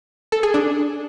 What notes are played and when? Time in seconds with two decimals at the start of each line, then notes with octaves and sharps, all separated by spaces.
0.32 A4
0.43 G#4
0.54 D4